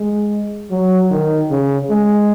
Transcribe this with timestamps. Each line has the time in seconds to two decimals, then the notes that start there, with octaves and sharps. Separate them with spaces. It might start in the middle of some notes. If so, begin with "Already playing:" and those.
Already playing: G#3
0.71 F#3
1.11 D#3
1.50 C#3
1.90 G#3